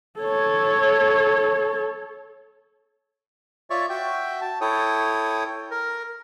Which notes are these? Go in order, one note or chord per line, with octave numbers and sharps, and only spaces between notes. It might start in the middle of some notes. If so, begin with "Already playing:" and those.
A4 C#5
F4 C#5 D5 E5 C#6
F#4 E5 G5
A5
E4 A4 C#5 G5 D#6
A#4